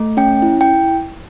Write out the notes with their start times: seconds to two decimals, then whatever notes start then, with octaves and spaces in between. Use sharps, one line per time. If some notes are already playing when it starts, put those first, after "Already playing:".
Already playing: A3
0.17 C#4 G5
0.42 E4
0.61 G5